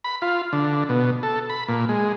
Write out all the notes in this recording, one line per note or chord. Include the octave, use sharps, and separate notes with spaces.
B5
F4
D3
B2
A4
B5
A#2
G#3